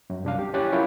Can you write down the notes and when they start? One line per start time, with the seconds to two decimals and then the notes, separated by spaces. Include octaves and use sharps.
0.10 F#2
0.25 C2 D4 F5
0.39 G4
0.54 D#2 C#4 E4 G4 F#6 A6
0.72 F#3 E4 F4 A#4 C#5